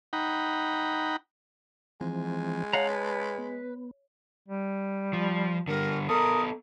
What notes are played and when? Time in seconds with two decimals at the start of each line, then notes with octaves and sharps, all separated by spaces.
0.13 D#4 F#5 G5 A#5 B5
2.01 E3 F3 G#3 C4
2.73 C#5 F5 F#5 A5 A#5
2.90 B4
3.38 B3
4.49 G3
5.13 F3
5.68 D3 G3 A#4
6.09 B3 A4 A#4 D#6